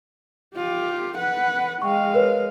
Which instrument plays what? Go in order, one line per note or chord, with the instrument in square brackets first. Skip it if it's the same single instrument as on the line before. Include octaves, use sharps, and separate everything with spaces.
[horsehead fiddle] F4 G4
B4 F#5
[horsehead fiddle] G#3 F5 [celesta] G5 C#6
[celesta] A#4 B4 C#5